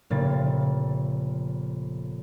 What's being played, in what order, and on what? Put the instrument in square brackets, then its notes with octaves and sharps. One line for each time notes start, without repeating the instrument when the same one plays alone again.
[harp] F1 A#2 C#3 A6